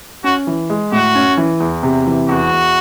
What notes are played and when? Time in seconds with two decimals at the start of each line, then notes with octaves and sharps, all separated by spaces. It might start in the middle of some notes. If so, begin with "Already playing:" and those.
0.24 C#4 F#4
0.47 E3
0.70 G#3
0.92 A2 F#4
1.15 C#4
1.37 E3
1.60 E2
1.83 C3
2.07 E3
2.29 E2 F#4
2.51 E2